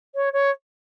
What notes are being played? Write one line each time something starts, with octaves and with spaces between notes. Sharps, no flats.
C#5
C#5